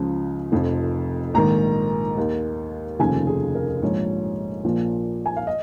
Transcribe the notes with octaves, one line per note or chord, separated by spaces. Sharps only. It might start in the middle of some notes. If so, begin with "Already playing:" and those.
Already playing: C#2 C#3 F3
F1 F2 F3
A#1 G#2 D#3 A#5
D#2 D#3
F1 D#2 C#3 F3 G#5
G#4
A#4
A#1 G#2 F3 C#5
A#1 A#2 F3
G#5
F5
D#5